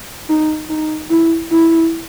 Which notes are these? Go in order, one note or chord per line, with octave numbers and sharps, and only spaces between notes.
D#4
D#4
E4
E4